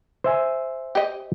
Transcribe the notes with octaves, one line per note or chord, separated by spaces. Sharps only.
C5 E5 G#5
G4 D#5